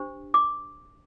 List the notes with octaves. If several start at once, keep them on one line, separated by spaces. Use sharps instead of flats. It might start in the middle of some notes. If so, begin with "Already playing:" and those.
Already playing: D4 G4 C5
D6